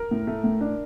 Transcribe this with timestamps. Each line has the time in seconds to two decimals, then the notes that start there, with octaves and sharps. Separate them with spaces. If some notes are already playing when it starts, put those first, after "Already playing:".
Already playing: A#4
0.11 A2
0.27 A3
0.44 A2
0.61 D4